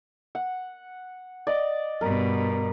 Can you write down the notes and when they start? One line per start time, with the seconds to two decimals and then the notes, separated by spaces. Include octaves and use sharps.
0.35 F#5
1.47 D5 D#5
2.01 G2 B2 A#4